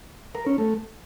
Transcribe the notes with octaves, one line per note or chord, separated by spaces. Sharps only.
A#4
C#4
A3